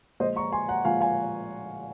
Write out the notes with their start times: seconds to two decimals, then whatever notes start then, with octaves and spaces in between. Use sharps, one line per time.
0.20 A#2 F3 G#3 C5 D#5
0.36 A#5 C#6
0.52 G#5 C6
0.68 F#5 A#5
0.85 A#2 F3 G#3 F5 G#5
1.01 F5 G#5